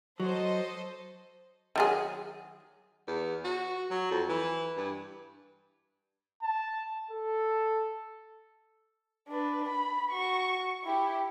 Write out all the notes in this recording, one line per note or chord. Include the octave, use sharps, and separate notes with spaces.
F#3 A4 C5 D#5
D#3 F#3 G#4
E2
F#4
F#3
F2
E3
G2
A5
A4
D4 B4
B5
F#4 C#6
E4 G4